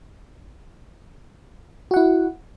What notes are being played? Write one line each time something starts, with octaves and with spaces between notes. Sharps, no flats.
E4 F#4 F#5